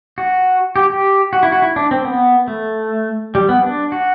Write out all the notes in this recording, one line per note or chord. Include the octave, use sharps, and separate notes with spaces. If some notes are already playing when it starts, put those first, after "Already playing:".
F#4
G4
G4
F#4
E4
F#4
E4
D4
C4
B3
A3
G3
B3
D4
F#4